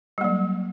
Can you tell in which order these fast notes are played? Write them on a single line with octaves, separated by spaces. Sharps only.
G3 A#3 F#3